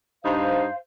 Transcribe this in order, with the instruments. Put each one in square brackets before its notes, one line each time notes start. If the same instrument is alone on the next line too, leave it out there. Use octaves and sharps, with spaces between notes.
[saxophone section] G2 D#4 [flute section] C5 F5